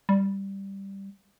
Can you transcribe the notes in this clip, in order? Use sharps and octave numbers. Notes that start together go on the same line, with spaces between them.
G3